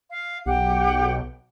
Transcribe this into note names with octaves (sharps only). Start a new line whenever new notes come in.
F5
B1 G4 F#5 G5